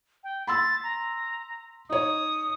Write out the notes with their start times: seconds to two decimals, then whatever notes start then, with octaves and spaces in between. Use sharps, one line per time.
0.24 G5
0.47 B5 C6 E6 A6
0.83 A#5
1.90 D#4 C#5 D#6